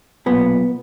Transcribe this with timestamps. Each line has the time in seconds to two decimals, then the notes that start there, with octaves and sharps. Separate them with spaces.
0.26 B1 A#2 B3